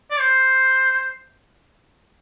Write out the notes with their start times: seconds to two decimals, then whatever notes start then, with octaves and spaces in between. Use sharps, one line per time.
0.11 D5
0.20 C5